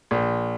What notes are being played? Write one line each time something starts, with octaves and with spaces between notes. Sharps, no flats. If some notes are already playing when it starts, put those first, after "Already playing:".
A#1